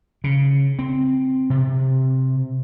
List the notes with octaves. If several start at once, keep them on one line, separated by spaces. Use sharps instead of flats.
C#3
C4
C3